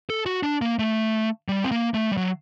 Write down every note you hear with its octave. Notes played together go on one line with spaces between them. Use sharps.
A4
F#4
D4
A#3
A3
G3
C4
A#3
A3
G3
F#3